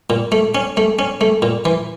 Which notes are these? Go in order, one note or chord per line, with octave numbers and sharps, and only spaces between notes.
A#2
A3
C#4
A3
C#4
A3
A#2
E3